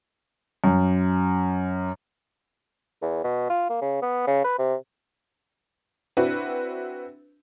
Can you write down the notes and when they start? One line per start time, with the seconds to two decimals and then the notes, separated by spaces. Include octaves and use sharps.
0.64 F#2
3.02 E2
3.24 B2
3.50 F4
3.70 A#3
3.82 C#3
4.02 B3
4.27 C#3
4.44 B4
4.59 C3
6.17 C4 D4 E4 F#4 B4